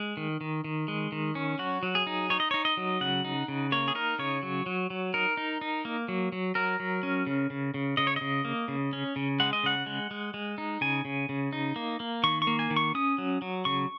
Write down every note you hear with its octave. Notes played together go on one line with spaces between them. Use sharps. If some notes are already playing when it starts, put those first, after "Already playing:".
Already playing: G#3
D#3
D#3
D#3
G#3
D#3
C#4
F#3 F#4
F#3
G#4
D#4
D#4 C#5
D#5
D#4 C#5
D#5
F#3
C#3 F#5
D#4
C#3
A#3 C#5
G#4
D#4 A#4
C#3 C#5
F#3
F#3
F#3
D#4 A#4
D#4
D#4
A#3
F#3
F#3
F#3 A#4
F#3
C#4
C#3
C#3
C#3
C#3 D#5
C#5
C#3 D#5
A#3
C#3
C#4
C#3
G#3 F#5
D#5
C#3 F#5
G#3
G#3
G#3
D#4
C#3 G#5
C#3
C#3
D#4
A#3
A#3
D#3 C#6
C#6
A#3
G#5
D#3
C#6
C#4 D#6
F#3
F#3
C#3 C#6